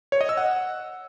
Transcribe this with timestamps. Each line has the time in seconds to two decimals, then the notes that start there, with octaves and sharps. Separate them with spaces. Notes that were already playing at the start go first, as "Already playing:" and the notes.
0.12 C#5
0.21 D#5
0.29 E6
0.37 F#5